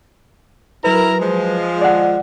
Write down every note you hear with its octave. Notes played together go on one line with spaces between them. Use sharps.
F#3 E4 A#4 B4 A#5
F3 G#3
D5 F#5